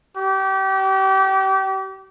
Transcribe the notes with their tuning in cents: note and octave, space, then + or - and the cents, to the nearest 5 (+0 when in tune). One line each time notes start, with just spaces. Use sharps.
G4 -30